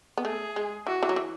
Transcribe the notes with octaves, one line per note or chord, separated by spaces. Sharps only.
B3
A3 G#4
G#3
E3 F#4
E3
F#3
E3